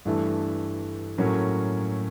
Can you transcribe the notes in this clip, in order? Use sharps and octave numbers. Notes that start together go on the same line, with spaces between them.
G2 E3 A3
A2 F#3 A#3 C#4